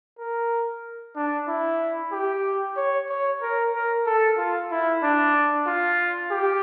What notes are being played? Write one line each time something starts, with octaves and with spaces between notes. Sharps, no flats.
A#4
D4
E4
G4
C#5
C#5
A#4
A#4
A4
F4
E4
D4
F4
G4